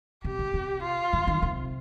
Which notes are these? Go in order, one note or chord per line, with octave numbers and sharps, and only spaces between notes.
C3 G4
C3
C3
F4
D3
D#3
C3